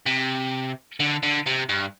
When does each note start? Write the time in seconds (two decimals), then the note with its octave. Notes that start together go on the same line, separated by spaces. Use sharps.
0.06 C3
1.00 D3
1.23 D3
1.47 C3
1.69 G2